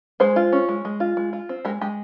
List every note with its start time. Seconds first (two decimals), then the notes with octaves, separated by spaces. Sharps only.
0.20 G#3 G#4 C5
0.36 F4
0.52 C#4
0.69 G#3
0.85 G#3
1.00 F4
1.17 G#3
1.33 F4
1.49 C4
1.65 G#3 G4 A#4
1.81 G#3 G4